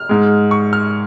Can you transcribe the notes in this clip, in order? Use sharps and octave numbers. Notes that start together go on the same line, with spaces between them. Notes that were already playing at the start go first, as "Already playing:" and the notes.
Already playing: F6
G#2 G#3
C#6
F6